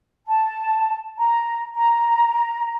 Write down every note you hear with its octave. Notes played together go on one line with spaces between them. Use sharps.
A5
A#5
A#5